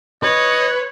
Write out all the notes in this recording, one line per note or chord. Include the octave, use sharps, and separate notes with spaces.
B4 C#5 D#5